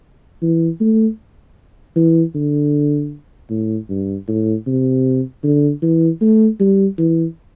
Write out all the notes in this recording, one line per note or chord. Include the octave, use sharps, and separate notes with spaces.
E3
A3
E3
D3
A2
G2
A2
C3
D3
E3
A3
G3
E3